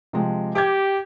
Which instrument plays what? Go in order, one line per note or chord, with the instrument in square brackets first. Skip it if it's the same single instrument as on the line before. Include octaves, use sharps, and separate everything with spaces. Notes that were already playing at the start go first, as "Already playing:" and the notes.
[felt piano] C3 F3 G#3
[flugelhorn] G4 [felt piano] D6 G6 G#6